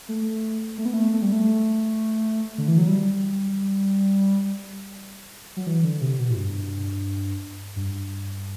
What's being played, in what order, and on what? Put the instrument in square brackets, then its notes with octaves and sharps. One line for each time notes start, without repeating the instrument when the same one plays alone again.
[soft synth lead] A3
A3
B3
A3
A3
G3
A3
D3
E3
F#3
G3
F#3
E3
D3
C3
B2
A2
G2
G2